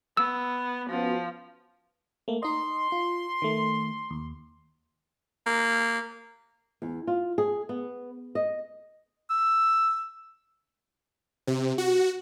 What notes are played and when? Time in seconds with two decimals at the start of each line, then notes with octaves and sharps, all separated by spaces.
0.17 B3 E6
0.90 F3 B3 C#4 F#4
2.28 A3 A#3
2.43 D#4 D#5 C6
2.92 F4
3.42 D#3 A3
4.11 D#2
5.46 A#3
6.82 E2
7.07 F4
7.38 G#4
7.69 B3
8.35 D#5
9.30 E6
11.47 C3
11.78 F#4